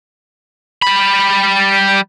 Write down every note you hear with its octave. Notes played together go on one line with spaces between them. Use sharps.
G3 B5